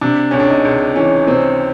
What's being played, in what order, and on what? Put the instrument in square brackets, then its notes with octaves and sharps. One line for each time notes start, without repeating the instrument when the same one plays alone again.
[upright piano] C3 D4
C#2 C#4
D4
D#4
C#2
E3 C#4
C3 C4